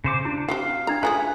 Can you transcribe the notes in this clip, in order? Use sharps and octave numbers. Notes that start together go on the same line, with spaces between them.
C#3 C5 D6
D4 E4
C4 F#4 G4 F5
D4 E4 A#5
A3 F4 G#4 B4 G5 G#5 A#5